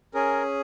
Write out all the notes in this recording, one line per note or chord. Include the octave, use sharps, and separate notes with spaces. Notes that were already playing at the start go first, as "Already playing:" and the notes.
C#4 G#4 A#4